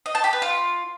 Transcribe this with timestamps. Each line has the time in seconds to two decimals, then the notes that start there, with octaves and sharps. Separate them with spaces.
0.06 D#5
0.15 A5
0.24 G4
0.33 B4
0.42 F4